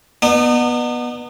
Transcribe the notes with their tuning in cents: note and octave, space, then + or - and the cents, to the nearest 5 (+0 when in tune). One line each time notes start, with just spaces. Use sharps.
B3 -15 D#4 -40